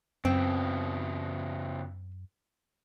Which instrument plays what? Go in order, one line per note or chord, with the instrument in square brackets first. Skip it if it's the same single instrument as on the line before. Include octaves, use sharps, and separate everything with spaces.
[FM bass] F#2 [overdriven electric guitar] C#3 B3 [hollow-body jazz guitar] C4